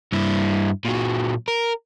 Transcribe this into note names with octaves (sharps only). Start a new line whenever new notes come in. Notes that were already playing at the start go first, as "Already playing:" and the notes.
G2 E4
A#2 F#3
A#4